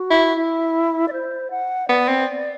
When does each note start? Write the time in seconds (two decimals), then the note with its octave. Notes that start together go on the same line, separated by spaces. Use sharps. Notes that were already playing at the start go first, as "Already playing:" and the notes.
Already playing: F#4
0.10 E4
0.36 E4
1.08 D5
1.13 C5
1.51 F#5
1.89 B3 D5
2.08 C4